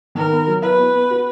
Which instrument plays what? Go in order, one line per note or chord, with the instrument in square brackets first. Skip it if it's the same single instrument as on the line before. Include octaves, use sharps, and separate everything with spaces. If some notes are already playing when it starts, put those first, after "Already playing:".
[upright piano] D#3 [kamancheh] A#4
[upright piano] B3
F#3
[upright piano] E4 [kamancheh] B4
[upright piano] B3
B3
F#4